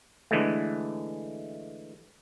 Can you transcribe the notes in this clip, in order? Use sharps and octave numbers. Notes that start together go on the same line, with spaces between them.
D3 E3 G#3 A3